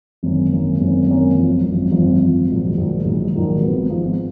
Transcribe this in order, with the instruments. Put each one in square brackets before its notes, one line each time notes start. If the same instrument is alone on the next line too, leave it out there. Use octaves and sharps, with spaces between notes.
[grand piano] G#1 F#2 D#3 A#3 C#4
G#1 F#2 D#3 A#3 C#4
G#1 F#2 D#3 A#3 C#4
G#1 F#2 D#3 A#3 C#4
G#1 F#2 F3
G#1 F#2 F3
G#1 F#2 F3
G#1 F#2 F3
A#1 G#2 D#3 F#3
A#1 G#2 D#3 F#3
A#1 G#2 D#3 F#3
A#1 G#2 D#3 F#3
G#1 G#2 F3 B3
G#1 G#2 F3 B3